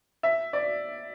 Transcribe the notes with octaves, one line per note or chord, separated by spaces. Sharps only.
E5
D5